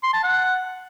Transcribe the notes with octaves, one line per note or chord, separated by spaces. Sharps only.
C6
A5
F#5